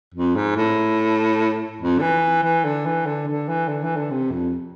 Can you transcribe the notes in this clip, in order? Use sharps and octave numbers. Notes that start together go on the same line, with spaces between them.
F2
G#2
A2
F2
D3
E3
E3
D3
E3
D3
D3
E3
D3
E3
D3
C3
F2